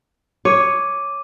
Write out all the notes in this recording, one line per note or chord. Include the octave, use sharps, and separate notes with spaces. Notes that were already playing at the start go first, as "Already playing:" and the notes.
C#5 D6 D#7